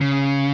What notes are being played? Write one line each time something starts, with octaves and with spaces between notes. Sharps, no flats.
C#3